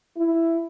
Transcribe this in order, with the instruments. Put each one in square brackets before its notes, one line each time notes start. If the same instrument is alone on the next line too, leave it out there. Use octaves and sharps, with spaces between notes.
[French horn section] E4